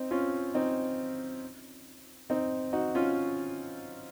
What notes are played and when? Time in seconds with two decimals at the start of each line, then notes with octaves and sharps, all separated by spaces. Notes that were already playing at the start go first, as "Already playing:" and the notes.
Already playing: C4 D#4
0.11 C#4 F4
0.54 C4 D#4
2.30 C4 D#4
2.73 D#4 F#4
2.95 C#4 F4